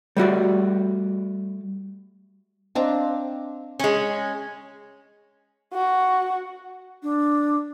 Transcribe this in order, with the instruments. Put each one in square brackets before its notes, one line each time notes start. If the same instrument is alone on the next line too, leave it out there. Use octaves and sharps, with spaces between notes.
[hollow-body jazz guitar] G3 A3 F#4 D5
[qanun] C4 D4 A#5 [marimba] D#5 F5 C6
[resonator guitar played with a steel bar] G#3 C#4
[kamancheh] F#4
[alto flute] D4